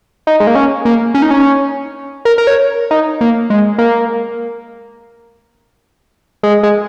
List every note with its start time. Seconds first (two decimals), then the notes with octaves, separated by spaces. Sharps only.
0.27 D#4
0.40 G#3
0.47 A#3
0.55 C#4
0.85 A#3
1.14 C#4
1.22 D#4
1.31 C#4
2.25 A#4
2.38 A#4
2.47 C#5
2.91 D#4
3.21 A#3
3.50 G#3
3.78 A#3
6.43 G#3
6.63 G#3